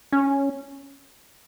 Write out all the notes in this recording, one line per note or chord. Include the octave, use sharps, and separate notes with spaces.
C#4